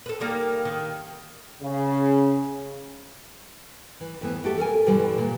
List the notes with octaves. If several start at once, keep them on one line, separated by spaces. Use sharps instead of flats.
A4 B4
D#3 G3 A#3
D#3
C#3
E3
F2 E3 B3
F#4 G4 A4 E5
A4 A#4 F#5 G#5
G2 B2 D3 E3 G3
A#2